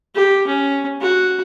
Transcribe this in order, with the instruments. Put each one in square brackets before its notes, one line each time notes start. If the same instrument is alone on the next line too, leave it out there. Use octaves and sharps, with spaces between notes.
[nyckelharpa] G4
C#4
F#4